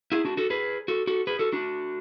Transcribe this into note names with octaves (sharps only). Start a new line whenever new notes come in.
E4 G#4
D4 F#4
F#4 A4
G#4 B4
F#4 A4
F#4 A4
G#4 B4
F#4 A4
D4 F#4